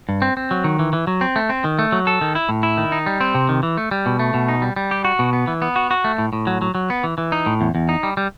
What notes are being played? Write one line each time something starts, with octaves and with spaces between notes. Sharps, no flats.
G2
C4
C4
F#3
D#3
E3
E3
F#3
C4
A3
C4
D#3
A3
F#3
A4
D#3
E4
A2
E4
D#3
D#4
G3
C4
C3
D#3
E3
A3
G3
B2
A3
B2
D#4
G3
G3
G4
F#4
B2
B3
E3
B3
F#4
F#4
A3
A2
A2
F#3
F#3
F#3
B3
E3
E3
D#4
A2
E2
E2
D#4
G3
G3